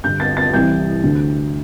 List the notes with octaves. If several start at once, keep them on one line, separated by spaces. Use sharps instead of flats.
G2 D3 G6
A6
A6
C2 C3 E3 G6
D2 D3